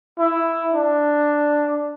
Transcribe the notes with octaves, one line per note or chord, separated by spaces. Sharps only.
E4
D4